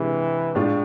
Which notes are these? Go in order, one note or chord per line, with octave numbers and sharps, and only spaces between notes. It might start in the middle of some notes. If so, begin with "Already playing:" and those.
Already playing: C3 E3 G#3 D4
A2 G#3 D4 F4